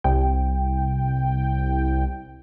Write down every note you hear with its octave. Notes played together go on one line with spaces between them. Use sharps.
C2 G5